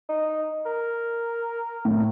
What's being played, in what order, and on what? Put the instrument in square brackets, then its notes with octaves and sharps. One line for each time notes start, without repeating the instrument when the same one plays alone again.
[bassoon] D#4
A#4
[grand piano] A2